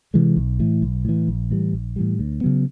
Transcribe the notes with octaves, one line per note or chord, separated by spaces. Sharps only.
C3 E3 G#3
B1
A2 E3
B1
A2 E3
A#1
A2 E3 G3
A#1
A2 E3 G3
D2
C#3 F#3 B3